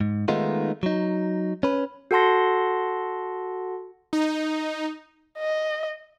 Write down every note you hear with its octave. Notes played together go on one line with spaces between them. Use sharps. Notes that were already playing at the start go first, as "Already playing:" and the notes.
G#2
D#3 G#3 A3 B3 D#4 F4
F#3 D#4
C#4 B4
F#4 A4 F#5 A5 C6 A#6
D#4
D#5